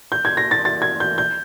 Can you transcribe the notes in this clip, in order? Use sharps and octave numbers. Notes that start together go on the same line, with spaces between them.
G6
G#6
A#6
A6
A6
G#6
G6
G6